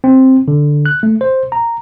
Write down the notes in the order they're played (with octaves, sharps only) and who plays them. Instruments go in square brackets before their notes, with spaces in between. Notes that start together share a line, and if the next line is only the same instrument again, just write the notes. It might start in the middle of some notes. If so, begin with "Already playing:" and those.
[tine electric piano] C4
D3
F#6
A3
C5
A#5